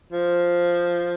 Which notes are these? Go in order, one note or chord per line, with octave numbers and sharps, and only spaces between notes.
F3